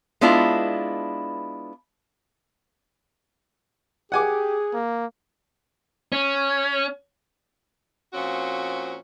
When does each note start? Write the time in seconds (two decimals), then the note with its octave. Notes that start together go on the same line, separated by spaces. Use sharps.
0.21 G#3 B3 D4 E4 F4
4.12 G4 G#4 F#5 G#5 D6
4.73 A#3
6.12 C#4
8.14 A#2 F3 C4 C#4 F#4